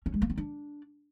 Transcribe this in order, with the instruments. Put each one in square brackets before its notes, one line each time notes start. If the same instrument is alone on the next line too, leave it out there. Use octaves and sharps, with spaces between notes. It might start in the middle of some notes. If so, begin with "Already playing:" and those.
[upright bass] C#4
G#3
A#3
C4
D4